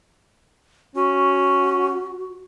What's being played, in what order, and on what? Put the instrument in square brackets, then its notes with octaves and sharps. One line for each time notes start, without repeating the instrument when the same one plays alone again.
[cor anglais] C#4 [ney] F#4